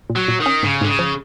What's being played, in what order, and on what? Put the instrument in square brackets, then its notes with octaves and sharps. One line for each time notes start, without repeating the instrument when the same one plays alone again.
[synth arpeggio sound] A#2
[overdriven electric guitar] F#3
[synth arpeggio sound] A#2
[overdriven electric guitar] D#3
[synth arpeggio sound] C#4
[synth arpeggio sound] G#2 [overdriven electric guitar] C#3
[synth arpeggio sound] G#2 [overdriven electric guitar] D3
[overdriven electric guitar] C#3
[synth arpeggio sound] F3